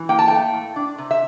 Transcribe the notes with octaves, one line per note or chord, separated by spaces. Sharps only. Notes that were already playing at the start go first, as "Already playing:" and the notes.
Already playing: E3
A#3 G5
A5
A3 G5
A2
D4
C3
E5